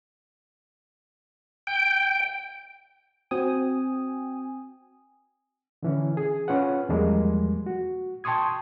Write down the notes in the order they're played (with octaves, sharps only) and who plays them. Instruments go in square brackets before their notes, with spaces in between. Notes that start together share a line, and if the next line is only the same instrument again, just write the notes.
[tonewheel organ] G5
[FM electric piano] C4 F#4 G5 G#5 D#6
[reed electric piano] D3 E3 C#4
G#4
C#4 F4 B4 F#5
E2 F3 G3 G#3 A#3
F#4
G5 A5 C6 C#6 D#6 G#6